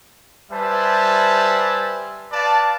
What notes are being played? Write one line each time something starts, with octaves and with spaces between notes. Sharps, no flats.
G3 B4 C5 E5 G#5 A5
B4 D5 F5 A5